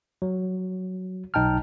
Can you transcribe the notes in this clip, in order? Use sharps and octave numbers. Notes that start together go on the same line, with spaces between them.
F#3
B1 D#4 G5 A5 F6